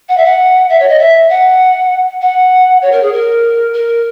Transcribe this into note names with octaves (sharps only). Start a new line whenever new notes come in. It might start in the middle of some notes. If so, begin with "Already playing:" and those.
F#5
E5
F#5
E5
C#5
D#5
E5
F#5
F#5
C#5
A#4
G#4
A#4
A#4